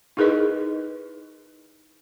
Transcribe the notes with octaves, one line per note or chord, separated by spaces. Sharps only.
D#4 E4 G#4 A#4 B4 D#5